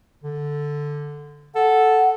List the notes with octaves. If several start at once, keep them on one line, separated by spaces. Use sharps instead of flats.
D3
A4 F#5